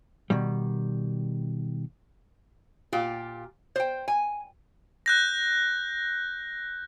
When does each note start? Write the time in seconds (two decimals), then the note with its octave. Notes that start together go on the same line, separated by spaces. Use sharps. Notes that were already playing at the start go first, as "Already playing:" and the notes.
0.30 B2 D#3 G3
2.93 A#2 F4 G4
3.76 C5 G5
4.08 G#5
5.06 F#6 G6 A#6